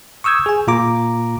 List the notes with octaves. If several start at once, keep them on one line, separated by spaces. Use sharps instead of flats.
C#6 D#6 E6 G6 G#6
G#4 G#5
A#2 A#3 F4 A#5 D6